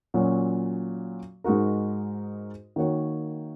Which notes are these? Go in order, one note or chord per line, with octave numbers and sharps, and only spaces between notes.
A#2 F#3 C#4 F#4 C#5
G#2 G#3 D#4 F#4 A#4
D#3 A#3 F#4 C#5